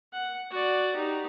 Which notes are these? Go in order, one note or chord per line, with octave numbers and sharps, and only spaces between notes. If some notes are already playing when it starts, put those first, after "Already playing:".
F#5
F#4 D5
D#4 G4